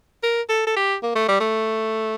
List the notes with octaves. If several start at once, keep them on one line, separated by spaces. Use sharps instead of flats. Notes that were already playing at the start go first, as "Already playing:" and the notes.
A#4
A4
A4
G4
A#3
A3
G3
A3